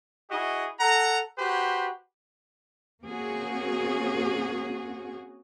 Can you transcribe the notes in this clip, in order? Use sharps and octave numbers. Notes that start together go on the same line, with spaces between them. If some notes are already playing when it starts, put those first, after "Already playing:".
E4 F#4 G#4 D#5
A4 F#5 A#5
F#4 G4 B4 C5
A#3 C4 C#4 F#4 G#4